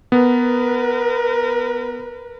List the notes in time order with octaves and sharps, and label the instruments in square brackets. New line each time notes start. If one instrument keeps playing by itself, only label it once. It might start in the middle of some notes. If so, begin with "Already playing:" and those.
[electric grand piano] B3 [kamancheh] A#4 B4